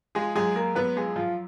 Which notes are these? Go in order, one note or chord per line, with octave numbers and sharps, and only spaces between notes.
F3 G#3 G#4
F#2 G#3 G#4
G#3 A#3 A#4
F#2 B3 B4
F3 G#3 G#4
F#2 F3 F4